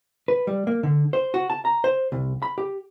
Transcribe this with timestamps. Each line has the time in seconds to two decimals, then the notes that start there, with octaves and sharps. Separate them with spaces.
0.28 B4
0.47 G3
0.67 A#3
0.83 D3
1.13 C5
1.34 F#4
1.50 A5
1.65 A#5
1.84 C5
2.12 C2
2.42 B5
2.58 G4